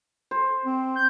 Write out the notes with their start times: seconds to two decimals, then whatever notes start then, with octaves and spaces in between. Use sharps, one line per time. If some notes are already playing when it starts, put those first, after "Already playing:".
0.31 C5
0.65 C4
0.96 G6